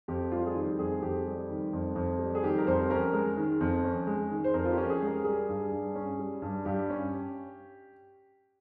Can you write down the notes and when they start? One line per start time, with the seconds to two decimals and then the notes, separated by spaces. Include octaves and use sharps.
0.08 F2 G4
0.32 G3 F4
0.46 G#4
0.55 D#3 G4
0.79 F2 G#4
1.02 F2 G4
1.26 G3
1.50 D#3
1.73 F2
1.96 F2
2.19 G3
2.35 G#4
2.42 D#3 G4
2.58 A#4
2.67 F2 C5
2.90 C#4 A#4
3.13 G#3
3.37 D#3
3.61 F2
3.85 C#4
4.07 G#3
4.31 D#3
4.44 C5
4.54 F2 A#4
4.65 F4
4.72 G4
4.77 C#4
4.90 G#4
5.02 G#3
5.07 A#4
5.24 G3 G#4
5.49 G2
5.71 G2
5.96 C#4
6.19 G3
6.42 G2
6.65 G2 G4
6.90 C#4